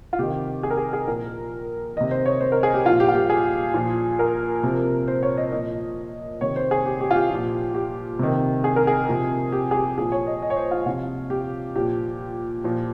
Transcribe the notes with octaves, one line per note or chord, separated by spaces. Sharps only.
F4
C3 D#3 G4
G#4
A#4
G#4
G#4
A#2 F3 A#4
C3 D#3 D#5
C5
C#5
C5
A#4
G#4
G4
A#2 F3 F4
G4
F4
G4
G#4
A#2 F3
A#4
C3 F3
C5
C#5
D#5
A#2 F3 D#5
C3 D#3 C#5
C5
G#4
G4
G4
F4
G4
A#2 F3
G4
C3 D#3
G#4
A#4
G#4
C3 F3
G4
G#4
G4
A#2 F3 G#4
C#5
D#5
D#5
C#5
C5
F4
C3 F3 F4
G4
A#2 F3 G4
A#2 F3